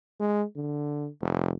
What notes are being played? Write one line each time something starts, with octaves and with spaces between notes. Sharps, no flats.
G#3
D3
F1